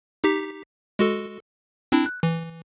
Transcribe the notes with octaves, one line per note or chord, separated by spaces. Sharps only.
D#4 G4 B6
G#3 F#4 A4
C4 D4 E4
F#6
E3